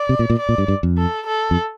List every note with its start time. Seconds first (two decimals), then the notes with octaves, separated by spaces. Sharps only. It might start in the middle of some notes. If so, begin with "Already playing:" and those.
Already playing: D5
0.09 C3
0.19 A#2
0.30 A#2
0.39 D5
0.49 A#2
0.58 G2
0.68 G2
0.83 F2
0.98 A4
1.26 A4
1.51 F2